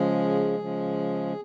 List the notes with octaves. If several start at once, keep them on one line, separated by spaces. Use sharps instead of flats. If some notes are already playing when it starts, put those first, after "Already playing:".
Already playing: C#3 F3 G#3 G#4
C#3 F3 G#3